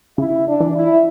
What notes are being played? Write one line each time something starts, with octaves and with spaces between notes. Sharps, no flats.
C#3 E4
D4
E3
E4